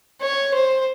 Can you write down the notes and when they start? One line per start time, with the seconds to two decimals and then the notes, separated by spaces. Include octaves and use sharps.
0.22 C#5
0.54 C5